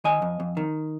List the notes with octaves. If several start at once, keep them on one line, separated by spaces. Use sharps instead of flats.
D#3 D#5 G#5
F2
F2
D#3